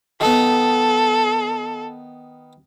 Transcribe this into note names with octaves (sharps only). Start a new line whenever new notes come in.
D#3 B3 A4